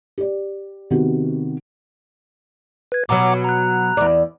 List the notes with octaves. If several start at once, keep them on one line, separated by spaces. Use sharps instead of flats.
G4 D5
C3 D#3 B3 F#4 G4
B4 G#6
B2 F#3 F#5 A#5 D6
A#5 F#6
E2 D5